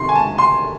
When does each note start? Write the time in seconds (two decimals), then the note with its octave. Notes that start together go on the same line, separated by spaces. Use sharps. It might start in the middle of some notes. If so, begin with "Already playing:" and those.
Already playing: C3 D#3 C6 C#6
0.09 G#5
0.15 A5
0.38 C6